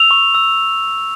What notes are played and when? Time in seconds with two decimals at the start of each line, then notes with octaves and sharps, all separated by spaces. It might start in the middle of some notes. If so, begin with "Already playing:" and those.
Already playing: E6 F7
0.11 C#6
0.35 E6